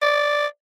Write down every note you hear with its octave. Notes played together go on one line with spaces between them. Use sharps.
D5